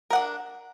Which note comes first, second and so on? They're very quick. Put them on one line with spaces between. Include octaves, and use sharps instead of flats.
A#4 F#5 D4